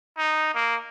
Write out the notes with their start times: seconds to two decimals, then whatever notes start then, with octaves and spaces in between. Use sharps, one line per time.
0.17 D#4
0.54 A#3